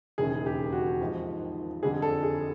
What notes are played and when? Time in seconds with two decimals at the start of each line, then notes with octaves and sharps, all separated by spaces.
0.18 E1 D#2 C#3 G#4
0.46 G4
0.72 F#4
1.01 G#1 G#2 F3
1.83 F2 D3 G3 G#4
2.02 A4
2.23 G#4